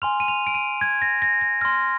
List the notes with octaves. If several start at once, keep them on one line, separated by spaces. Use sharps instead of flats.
G#5 C6 F6 F7
D#7
F7
D7
D#7
G#6
A#6
A#6
A#6
C6 F6 A#6